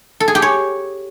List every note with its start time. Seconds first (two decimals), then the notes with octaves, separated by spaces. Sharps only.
0.20 A4
0.28 G#4
0.35 G4
0.42 C#5